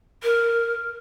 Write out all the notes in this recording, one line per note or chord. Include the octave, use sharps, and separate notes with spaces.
A#4